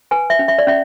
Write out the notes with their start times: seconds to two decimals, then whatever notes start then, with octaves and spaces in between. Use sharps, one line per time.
0.11 B4 G#5
0.30 E5
0.39 C#4
0.48 E5
0.58 D5
0.67 C#4 E5